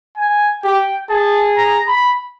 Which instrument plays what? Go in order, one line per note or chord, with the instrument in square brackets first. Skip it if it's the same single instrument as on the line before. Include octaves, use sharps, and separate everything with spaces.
[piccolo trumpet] G#5
[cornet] G4 [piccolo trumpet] G5
[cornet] G#4 [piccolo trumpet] A5
[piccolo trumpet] A#5
B5